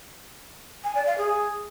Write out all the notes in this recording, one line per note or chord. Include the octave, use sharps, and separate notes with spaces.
G#5
D5
F5
G#4